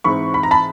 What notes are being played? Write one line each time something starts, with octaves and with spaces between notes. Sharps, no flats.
G#2 E3 G#3 C4 B5 C#6
B5
A#5
A5 B5